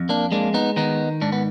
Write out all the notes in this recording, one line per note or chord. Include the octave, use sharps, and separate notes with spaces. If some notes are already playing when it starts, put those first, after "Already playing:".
Already playing: F2
A#3 D4
G#3 A#3 D4
B3 D#4
D#3 B3 D#4
G#2 D4
B3